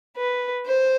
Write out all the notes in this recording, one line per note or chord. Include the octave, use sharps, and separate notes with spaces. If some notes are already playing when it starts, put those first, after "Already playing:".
B4
C5